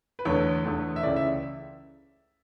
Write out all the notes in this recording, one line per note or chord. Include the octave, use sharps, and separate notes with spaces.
B4
E2 D3 A3 C#5
E2 D3 A3
E5
C#2 C#3 E3 A3 D5
E5